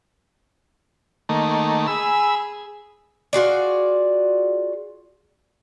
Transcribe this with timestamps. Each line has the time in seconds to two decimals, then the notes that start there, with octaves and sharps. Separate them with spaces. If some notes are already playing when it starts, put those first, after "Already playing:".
1.29 D#3 A3 A#3
1.87 G#4 G#5 B5 E6
3.33 F4 F#4 G#4 D5